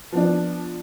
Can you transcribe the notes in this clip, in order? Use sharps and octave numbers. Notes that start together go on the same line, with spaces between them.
F3 B3 D4